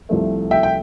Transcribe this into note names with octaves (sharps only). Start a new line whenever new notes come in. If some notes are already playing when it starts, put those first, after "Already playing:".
C2 C3 F3 A3
E5 G5
G5